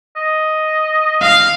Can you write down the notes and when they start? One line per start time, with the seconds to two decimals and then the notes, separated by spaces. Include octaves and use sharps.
0.16 D#5
1.22 F5